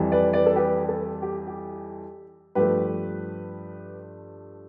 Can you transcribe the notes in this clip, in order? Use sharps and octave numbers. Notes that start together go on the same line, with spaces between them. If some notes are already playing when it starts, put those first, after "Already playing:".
Already playing: F2 E3 G3
B4 D5
B4 D5
A4
G4 B4
A4
G4
G4
G2 F3 A3 G4 B4